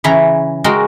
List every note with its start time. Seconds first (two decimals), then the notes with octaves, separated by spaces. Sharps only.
0.04 C#3 E3 C#5 A#5
0.64 G#3 F#4 A#4 G5